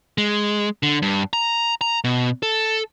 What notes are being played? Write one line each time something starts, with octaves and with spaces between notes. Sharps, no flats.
G#3
D3
G2
A#5
A#5
B2
A4